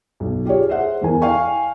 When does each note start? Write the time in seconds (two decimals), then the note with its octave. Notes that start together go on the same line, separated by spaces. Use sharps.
0.20 B1
0.45 F4 G4 G#4 C#5
0.69 G#4 C5 E5 F#5
1.01 E2 E4 A#4 G#5
1.22 F5 G5 G#5 C#6